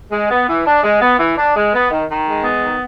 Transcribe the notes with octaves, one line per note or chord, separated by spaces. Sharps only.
G#3
B3
E3
D4
G#3
B3
E3
D4
G#3
B3
D#3
D#3
G#3
B3
D#3